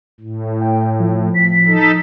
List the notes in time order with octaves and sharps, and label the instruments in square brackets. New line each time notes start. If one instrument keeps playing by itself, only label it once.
[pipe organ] A2
[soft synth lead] G5
F3
[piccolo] B6
[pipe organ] D#4 A4